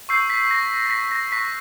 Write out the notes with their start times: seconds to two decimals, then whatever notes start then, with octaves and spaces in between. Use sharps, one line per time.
0.09 C#6 E6 G6 C7
0.30 B6
0.51 A#6
0.86 A#6
0.91 B6
1.12 A#6
1.32 C#6 F#6 B6